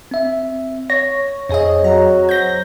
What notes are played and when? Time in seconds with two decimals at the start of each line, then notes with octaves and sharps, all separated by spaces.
0.11 C4 E5
0.90 C#5 A#6
1.49 F2 C4 G#4 C#5 D#5
1.84 F#3 A#5
2.29 C5 G6 A#6